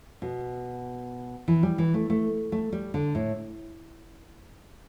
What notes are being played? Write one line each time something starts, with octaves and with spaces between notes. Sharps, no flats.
B2
E3
G3
E3
A3
A3
A3
G3
D3
A2